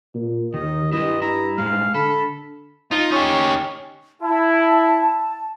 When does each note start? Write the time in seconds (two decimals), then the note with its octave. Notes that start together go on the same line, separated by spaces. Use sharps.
0.15 A#2
0.54 D#2 D#3 D#5
0.92 G2 E4 G4 D#5
1.22 E4 A#5
1.58 A2 G#3 F5
1.94 D3 A4 B5
2.91 D#4 F4
3.12 C#4 D#4 G4
4.21 E4 A5